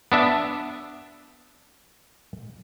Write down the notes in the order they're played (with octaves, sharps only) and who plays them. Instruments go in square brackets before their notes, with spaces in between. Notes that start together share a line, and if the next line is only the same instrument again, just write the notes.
[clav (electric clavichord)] B3 D4 E5